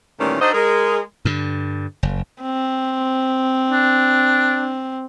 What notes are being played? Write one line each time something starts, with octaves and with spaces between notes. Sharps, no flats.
A#2 D#3 E3 G3 A3 C#4
D4 D#4 F#4 A4 C5 D#5
G#3 G#4 A#4
G2 D3
F#1
C4
D4